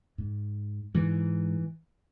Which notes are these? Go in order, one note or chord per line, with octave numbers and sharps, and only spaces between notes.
G#2
G#2 E3